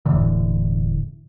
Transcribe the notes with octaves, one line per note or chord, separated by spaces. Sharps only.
E1 A2 D3 E3